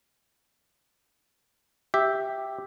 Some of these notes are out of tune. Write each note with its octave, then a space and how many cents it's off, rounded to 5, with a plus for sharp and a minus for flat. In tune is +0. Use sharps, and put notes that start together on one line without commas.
G4 +0 E5 -5